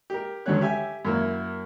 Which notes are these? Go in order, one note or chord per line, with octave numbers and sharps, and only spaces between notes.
G4 A#4
D2 G2 F#3 C#4 C#5 F#6
G4 E5 G#5
F#2 A#3 E4